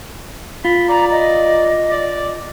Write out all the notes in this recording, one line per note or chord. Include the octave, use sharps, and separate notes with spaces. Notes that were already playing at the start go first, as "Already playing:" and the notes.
F4 B5
D5 A#5
D#5
D5